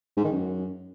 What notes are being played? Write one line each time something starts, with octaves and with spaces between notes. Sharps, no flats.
G#2
D#3
F#2